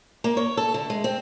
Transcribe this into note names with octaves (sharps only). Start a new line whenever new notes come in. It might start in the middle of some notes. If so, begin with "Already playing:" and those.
A#3
C#5
A4
D3
G#3
C4